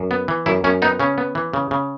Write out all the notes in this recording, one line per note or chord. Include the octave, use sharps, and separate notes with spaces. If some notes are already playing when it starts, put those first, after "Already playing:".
Already playing: F#2
B3
E3
F#2 E4
F#2 C#4
B3 D#4
C#3 C#4
B3
E3
C#3
C#3